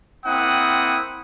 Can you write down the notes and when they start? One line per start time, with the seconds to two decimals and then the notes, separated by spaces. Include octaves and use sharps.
0.25 A#3 C4 E4 F#5 G5 D#6